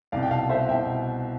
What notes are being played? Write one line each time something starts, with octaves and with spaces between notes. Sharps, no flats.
C2 B2 D5 F5
G5
F5 A5
C5 E5
C2 B2 E5 G5